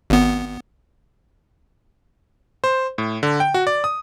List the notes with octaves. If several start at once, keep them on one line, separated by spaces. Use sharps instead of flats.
G#1 B3
C5
A2
D3
G5
F#4
D5
D#6